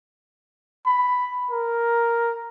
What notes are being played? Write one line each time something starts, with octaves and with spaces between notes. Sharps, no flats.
B5
A#4